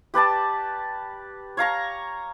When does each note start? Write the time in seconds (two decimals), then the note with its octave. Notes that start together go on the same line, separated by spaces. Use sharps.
0.14 G4 B4 D5 A5
1.57 C#5 F5 A#5 C#6